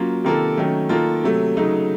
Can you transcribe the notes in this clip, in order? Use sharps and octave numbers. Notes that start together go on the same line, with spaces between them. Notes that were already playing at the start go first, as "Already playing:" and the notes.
Already playing: F#3 A#3 C#4 F4
C3 D#3 A#3 F4 A4
D#3 F#3 A3 C#4
D#3 A#3 F4 A4
C3 F#3 A3
C#3 F#3 A3 D#4